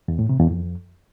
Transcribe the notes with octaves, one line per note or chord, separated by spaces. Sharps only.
E2
A2
C3
E2
F2